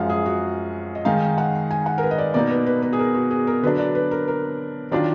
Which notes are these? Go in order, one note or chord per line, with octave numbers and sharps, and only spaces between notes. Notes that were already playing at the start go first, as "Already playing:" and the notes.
Already playing: F#2 F3 G#3 F5 F#5
G#4
F#4
D#5
D#3 G#3 D#4 F5
F#5
G#5
F#5
A#4
B4
D#5
D5
B2 A#3 D#4 D5
B4
B4
B4
G#4
A#4
F#4
G#4
A#4
D3 F#3 D4 B4
D5
B4
A#4
A#4
D#3 F#3 D4 F4 D5